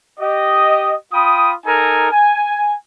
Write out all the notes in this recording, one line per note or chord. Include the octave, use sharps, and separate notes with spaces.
G4 D#5
F4 G5 B5 D#6
D#4 A4 A#4 G#5 A#5
G#5